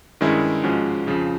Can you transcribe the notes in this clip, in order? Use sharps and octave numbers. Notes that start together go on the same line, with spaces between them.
G2 D#3 G#3 C#4 E4
G#2 F3 G#3 C#4 F#4
F2 C#3 F3